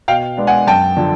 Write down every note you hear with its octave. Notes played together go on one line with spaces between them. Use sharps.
B2 F5 G5
G#3 B3 D4
F#5 G#5
F#2 G5 A5
D3 F3